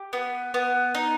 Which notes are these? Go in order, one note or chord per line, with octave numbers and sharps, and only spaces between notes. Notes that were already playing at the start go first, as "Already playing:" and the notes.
Already playing: G4
B3
B3
D#4